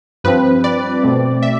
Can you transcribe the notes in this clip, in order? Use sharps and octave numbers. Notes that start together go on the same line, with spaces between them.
G2 F3 C4 B4
D5
B2 A3 C4
E5